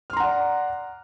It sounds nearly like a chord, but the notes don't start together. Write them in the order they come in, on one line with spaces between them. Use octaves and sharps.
F6 C6 A#5 F#5 D5